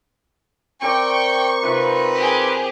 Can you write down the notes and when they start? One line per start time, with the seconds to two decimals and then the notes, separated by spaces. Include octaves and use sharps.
0.82 C4 A#4 D5 G5 C#6
1.62 C3 C4 D#4 F4 B4
2.16 G4 G#4